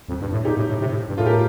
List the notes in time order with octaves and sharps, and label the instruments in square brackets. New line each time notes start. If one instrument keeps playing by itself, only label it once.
[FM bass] F2
G2
A2
[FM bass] A#2 [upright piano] D#4 G4
[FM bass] A2
A2
C3
A2
G2
[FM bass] A2 [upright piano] F4 A4
[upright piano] G4 A#4